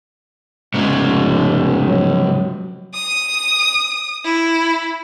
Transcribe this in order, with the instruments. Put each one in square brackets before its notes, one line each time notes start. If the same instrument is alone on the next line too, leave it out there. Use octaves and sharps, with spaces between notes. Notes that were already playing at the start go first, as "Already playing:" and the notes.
[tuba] F1 [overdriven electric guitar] G#2 C#3
[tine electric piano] F#3
[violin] D#6
E4